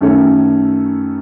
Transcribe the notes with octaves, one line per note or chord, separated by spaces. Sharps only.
F#2 D#3 A3 C#4